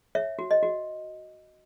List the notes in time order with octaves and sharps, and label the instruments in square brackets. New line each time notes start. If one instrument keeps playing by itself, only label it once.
[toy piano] C#5 E5
F#4
D#5
F#4